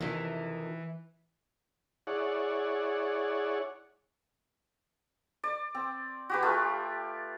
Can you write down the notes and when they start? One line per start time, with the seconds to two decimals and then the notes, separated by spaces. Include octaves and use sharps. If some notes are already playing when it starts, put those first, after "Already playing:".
0.01 F2 C3 D#3 E3
2.07 E4 G#4 C#5 D5 F#5
5.44 D5
5.75 C4
6.29 F#4 G4 B4
6.43 A3 F4 G4